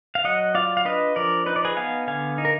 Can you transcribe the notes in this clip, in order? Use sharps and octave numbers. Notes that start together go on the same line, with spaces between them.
F5
F#3 D#5 F#5
F4 D5 F5
F5
D4 B4 D#5
F3 A#4 D5
D#4 B4
D5
G#4 B4
B3 F5 G#5
D3 F5 G#5
D#4
A#4